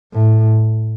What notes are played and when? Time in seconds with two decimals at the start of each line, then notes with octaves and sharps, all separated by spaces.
0.13 A2